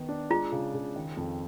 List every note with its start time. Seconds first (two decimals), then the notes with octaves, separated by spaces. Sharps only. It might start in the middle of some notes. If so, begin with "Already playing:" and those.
Already playing: D#3 B3
0.09 D4
0.31 G#3 F4
0.52 C#3
0.74 C#3
0.96 D#3
1.17 F2